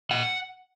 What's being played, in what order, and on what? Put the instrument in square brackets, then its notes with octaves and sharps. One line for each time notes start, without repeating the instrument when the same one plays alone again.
[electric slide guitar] A#2 F#5